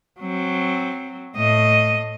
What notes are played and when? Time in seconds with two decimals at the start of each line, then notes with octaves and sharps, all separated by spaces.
0.20 F#3 C4
1.36 A2 D#5